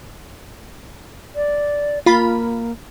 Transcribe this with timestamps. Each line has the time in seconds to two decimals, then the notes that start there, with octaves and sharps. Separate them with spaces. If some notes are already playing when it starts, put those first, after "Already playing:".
1.36 D5
2.06 A#3 F4 B5